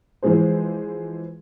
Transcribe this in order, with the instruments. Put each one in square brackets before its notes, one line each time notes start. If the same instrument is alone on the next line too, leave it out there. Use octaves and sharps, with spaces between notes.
[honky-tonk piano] E3 F3 G#3 G#4 C5